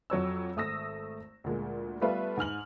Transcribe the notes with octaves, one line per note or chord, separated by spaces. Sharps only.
F2 F#3 C#5 E6
G#1 A3 D#6 E6 A#6
D2 A#2 G#3
G3 A3 B3 F4 B4 E5
G#2 G#5 F6 F#7